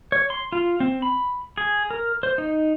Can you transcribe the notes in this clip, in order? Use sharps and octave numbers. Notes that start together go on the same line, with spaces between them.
C#5
C6
F4
C4
B5
G#4
A#4
C5
D#4